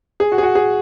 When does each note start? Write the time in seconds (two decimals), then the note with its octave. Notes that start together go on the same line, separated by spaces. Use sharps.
0.20 G#4
0.32 F#4
0.38 G#4
0.43 F#4
0.55 G#4